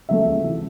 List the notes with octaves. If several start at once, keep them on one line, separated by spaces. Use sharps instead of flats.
C#3 F#3 A3 E5
C#2
C3 E3